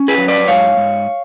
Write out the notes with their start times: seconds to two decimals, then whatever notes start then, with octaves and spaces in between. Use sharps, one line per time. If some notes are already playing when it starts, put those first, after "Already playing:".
Already playing: C#4
0.08 G#4 B4
0.18 F#3
0.28 B4 D5
0.48 G#2 C#5 F5
0.77 G#2